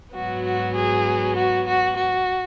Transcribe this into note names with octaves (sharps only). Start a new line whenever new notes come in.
G#2 F#3 B3 F#4
F#4
G#4
F#4
F#4
F#4